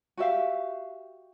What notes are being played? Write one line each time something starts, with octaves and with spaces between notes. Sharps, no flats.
F#4 G4 E5 F5